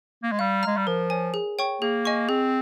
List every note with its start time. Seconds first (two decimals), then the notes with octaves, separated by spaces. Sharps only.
0.23 A#3
0.32 G#3
0.39 G3 F5
0.63 G#3 A#5 F6
0.77 G3
0.87 F3 A#4
1.10 C#5 G#5
1.34 G#4
1.59 C#5 G5 C#6
1.81 A#3 G#4
2.05 D#5 G#5 C#6
2.29 C4 G#4